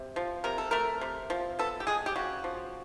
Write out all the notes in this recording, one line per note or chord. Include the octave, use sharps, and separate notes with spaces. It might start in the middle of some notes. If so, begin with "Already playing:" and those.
Already playing: C3
F3
C3 A#4
A4
A3 A#4
C3
F3
B3 A4
G4
G#3 G#4
G4
C#3 F#4
F3